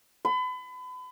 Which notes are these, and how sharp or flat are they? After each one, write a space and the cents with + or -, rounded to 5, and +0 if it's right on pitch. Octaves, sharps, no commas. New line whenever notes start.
B5 +35